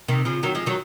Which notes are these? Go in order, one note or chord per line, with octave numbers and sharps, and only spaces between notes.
C3 D#3
C#3 F3
D#3 F#3
F3 G#3
D#3 F#3